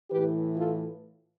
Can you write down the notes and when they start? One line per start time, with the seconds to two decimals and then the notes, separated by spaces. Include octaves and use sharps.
0.10 A2 E3 G4 B4
0.57 F4 A4